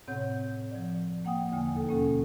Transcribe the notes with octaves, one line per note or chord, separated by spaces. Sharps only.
A2 C3 C4 C#5 F#5 G6
F3 D5
A#3 F#5 G5 D#6
E2 D3 A#3 G5 G#5
D#2 B2 A4
A#3 C#4 A4